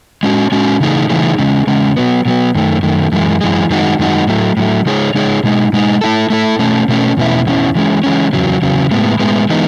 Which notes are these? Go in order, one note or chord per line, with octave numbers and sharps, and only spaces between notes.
G#3 C#4 F#4
G#3 C#4 F#4
C#3 E3 A3 D#4 G#4
C#3 E3 A3 D#4 G#4
E2 C#3 G#3 C#4
E2 C#3 G#3 C#4
B2 F#3 B3
B2 F#3 B3
F#2 D#3 A3
F#2 D#3 A3
F#2 E3 G#3
F#2 E3 G#3
F#2 D#3 G#3 D#4 F#4
F#2 D#3 G#3 D#4 F#4
A2 F#3 A3
A2 F#3 A3
C#3 G#3 D#4 G#4 C#5
C#3 G#3 D#4 G#4 C#5
B2 G#3 D#4
B2 G#3 D#4
A3 E4 A4
A3 E4 A4
B2 A3 C#4
B2 A3 C#4
E2 B2 A3 C#4 E4
E2 B2 A3 C#4 E4
E3 G#3 C#4
E3 G#3 C#4
E2 C#3 F#3
E2 C#3 F#3
A2 G#3 B3
A2 G#3 B3
E3 G#3 B3 D#4